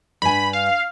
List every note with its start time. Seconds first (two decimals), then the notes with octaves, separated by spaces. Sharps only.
0.22 G2 G#5 B5
0.53 F5